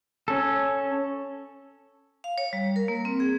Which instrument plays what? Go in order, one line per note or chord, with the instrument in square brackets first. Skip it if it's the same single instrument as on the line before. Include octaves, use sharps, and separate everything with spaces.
[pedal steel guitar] C#4 A4
[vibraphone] F5
C#5
G3
A#4
A#3
C4
G#4